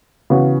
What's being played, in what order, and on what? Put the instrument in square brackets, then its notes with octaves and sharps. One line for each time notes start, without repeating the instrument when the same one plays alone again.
[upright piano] C#3 E3 B3 F#4